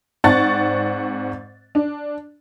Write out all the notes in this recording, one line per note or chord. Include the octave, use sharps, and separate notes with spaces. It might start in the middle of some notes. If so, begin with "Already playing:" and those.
G#2 C4 D5 F#5 C#6 A6
D4